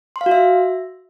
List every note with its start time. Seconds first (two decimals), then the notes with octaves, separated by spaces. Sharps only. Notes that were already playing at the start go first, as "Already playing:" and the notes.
0.16 C6
0.21 F5
0.26 F#4
0.31 E5